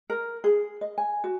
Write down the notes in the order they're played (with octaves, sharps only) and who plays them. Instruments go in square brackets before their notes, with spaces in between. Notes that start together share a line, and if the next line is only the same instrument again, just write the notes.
[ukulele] A#4
G#4
D#5
G#5
F#4